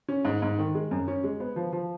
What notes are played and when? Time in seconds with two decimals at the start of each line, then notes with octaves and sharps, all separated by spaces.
0.08 C#4
0.25 G#2
0.42 G#2
0.59 D#3
0.75 G#3
0.91 F#2
1.08 C#4
1.24 G#3
1.40 B3
1.56 F3
1.72 F3